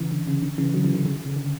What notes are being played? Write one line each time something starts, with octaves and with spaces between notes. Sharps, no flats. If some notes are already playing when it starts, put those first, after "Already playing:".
Already playing: C#3 E3
D3
C#3
D3
C#3 E3
D3 F#3
C#3 E3
D3
C#3
C#3
D3